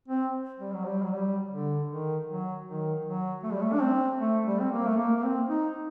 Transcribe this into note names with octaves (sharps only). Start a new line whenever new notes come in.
C4
G3
F#3
G3
F#3
G3
D3
D#3
F#3
D#3
F#3
A3
G3
A3
D4
C4
A3
G3
C4
A#3
A3
A#3
A#3
C4
D#4